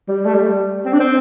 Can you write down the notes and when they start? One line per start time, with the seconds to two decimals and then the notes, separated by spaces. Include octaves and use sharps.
0.08 G3
0.26 A3
0.34 G3
0.85 C4
0.93 D4
1.00 C4